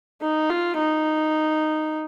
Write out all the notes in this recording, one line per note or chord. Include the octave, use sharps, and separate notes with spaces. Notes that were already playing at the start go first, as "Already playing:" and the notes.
D#4
F4
D#4